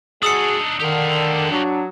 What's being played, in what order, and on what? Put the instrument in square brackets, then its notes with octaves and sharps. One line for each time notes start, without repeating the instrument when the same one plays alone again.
[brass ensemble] G#3 F#4 G#4 [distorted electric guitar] D4 D#4 [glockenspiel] D#6 E6 C#7
[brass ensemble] D3 [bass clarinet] D#3 [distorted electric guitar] G4 F5
[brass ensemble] F#3 [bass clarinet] D4